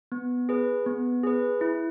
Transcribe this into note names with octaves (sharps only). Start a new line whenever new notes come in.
B3
G#4 B4
B3
G#4 B4
E4